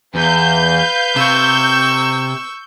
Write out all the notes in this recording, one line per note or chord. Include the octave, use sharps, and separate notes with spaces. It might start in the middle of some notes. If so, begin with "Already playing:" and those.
E2 B4 F5 G6
C3 C#6 E6